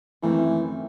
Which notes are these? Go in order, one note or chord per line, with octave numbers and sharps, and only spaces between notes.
F#2 D#3 E3 A3 C4 E4